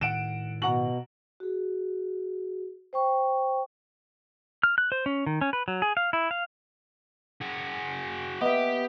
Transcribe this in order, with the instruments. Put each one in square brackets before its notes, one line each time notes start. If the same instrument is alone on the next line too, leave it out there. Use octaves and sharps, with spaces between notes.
[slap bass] A2 D#3 [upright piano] F#5 D7 E7
[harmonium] B2 [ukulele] F#4 F#5 A#5 [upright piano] F#7
[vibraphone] F#4 G#4
C5 G5 C#6
[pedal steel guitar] F6
F#6
C5
C#4
D#3
C#4
B4
F#3
G#4
F5
E4
F5
[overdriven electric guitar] F#4 G#4
[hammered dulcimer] B3 [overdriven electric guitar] G4 [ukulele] D#5 E5